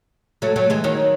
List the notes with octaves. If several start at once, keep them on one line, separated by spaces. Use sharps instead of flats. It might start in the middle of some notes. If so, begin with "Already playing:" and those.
F#3 A3
F#3 A3
E3 G#3
D#3 F#3